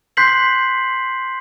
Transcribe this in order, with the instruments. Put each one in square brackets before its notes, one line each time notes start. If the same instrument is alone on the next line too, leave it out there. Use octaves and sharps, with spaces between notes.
[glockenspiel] C6 F#6 G6 B6 C7 F#7